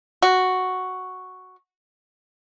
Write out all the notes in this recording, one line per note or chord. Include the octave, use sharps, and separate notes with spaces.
F#4